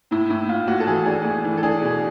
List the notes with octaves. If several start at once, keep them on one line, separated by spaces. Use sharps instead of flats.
A2 E4
A2 E4
A2 F4
A2 F#4
A4
E3 G#4
D4 G#4
A3
E3
A4
D4 G#4
B2